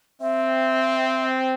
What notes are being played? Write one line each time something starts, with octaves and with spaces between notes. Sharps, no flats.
C4 E5